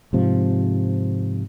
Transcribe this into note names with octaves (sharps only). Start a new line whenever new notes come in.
G#2 C3 F3